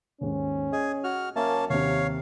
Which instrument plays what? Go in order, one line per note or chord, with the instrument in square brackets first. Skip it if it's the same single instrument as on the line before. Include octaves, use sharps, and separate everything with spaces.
[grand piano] D#2 G#2 [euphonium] C#4
[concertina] G#4 [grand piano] D#5
[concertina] F#4 F6
[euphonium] F#2 [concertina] A#3 C#4 A5 [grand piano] E5
[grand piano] D#2 C3 [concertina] C#5 F5